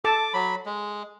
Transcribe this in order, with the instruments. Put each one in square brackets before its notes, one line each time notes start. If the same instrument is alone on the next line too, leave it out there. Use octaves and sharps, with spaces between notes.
[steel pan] A4 A5 [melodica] D6
[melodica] F#3 B5
G#3